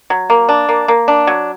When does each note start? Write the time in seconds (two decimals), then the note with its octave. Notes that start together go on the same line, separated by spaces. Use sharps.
0.10 F#3
0.30 A#3
0.49 D4
0.69 A#3
0.88 A#3
1.08 D4
1.27 F#3